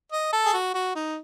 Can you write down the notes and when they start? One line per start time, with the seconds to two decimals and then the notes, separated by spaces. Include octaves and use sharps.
0.12 D#5
0.33 A4
0.46 G#4
0.54 F#4
0.74 F#4
0.95 D#4